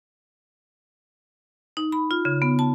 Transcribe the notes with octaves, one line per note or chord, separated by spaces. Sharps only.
D#4
B5
F4
C#3
B3
A5